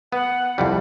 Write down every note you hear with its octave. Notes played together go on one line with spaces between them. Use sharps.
B3 F#5
C2 F2 G3